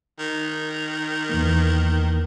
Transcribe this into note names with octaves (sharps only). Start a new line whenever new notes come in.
D#3
E2 E3 A#3